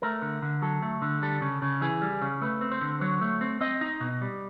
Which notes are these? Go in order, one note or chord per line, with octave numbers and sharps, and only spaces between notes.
A3 A#4
D3
D3
F#3 A4
A3
D3
G3 A4
C#3
C#3
E3 G#4
G3
C#3
A3 B4
C4
C5
D3
F#3 C#5
A3
C4
C4 D#5
D#4
B2
G3